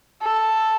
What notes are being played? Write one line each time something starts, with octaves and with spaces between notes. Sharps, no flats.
A4